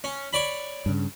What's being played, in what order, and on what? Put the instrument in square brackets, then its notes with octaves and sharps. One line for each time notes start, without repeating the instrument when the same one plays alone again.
[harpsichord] C#4
C#5 D5 B5
[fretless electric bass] G2 C#3